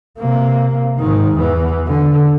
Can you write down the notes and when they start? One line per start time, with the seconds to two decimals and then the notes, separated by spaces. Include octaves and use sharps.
0.19 C3 A#3
0.98 G#2 D#3
1.36 E2 E3
1.87 D3